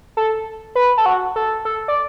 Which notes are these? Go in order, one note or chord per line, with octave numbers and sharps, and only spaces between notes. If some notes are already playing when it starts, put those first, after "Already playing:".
A4
B4
A4
F#4
A4
A4
D5